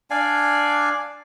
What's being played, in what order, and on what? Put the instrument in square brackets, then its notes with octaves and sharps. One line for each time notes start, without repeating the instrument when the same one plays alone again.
[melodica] D4 D5 F5 G#5